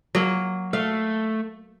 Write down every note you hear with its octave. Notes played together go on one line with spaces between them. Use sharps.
F#3 A#3
A3 F5